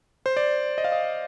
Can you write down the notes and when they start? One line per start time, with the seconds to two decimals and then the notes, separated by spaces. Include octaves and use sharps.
0.26 C5
0.37 D5
0.78 D#5
0.84 F5
0.92 D#5